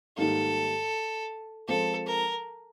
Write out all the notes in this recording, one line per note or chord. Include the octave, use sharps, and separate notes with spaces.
G#2 D#3 G3 A#3 A4
F3 G#3 C4 A4
A#4